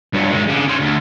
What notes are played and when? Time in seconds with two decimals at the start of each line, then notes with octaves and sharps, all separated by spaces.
0.13 G2 F#3
0.31 D#3 G#3
0.48 C#3 D4
0.68 C#4 C5
0.80 D2